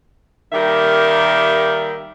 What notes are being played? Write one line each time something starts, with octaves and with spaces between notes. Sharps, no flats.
D#3 G3 A#3 G4 A#4 E5